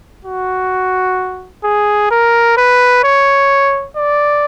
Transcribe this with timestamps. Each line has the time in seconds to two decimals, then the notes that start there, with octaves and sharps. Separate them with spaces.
0.25 F#4
1.64 G#4
2.11 A#4
2.57 B4
3.04 C#5
3.97 D5